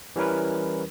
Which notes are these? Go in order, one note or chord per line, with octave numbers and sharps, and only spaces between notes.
E3 G3 C#4 E4 A#4 B4